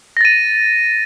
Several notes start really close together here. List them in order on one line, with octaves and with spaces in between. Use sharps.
A#6 A6 D#7